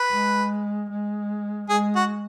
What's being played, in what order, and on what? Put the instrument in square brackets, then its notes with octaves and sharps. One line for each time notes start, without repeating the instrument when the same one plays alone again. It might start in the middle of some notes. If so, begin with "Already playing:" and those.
Already playing: [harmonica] B4
[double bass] G#3
G#3
[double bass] G#3 [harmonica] G#4
[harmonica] F#4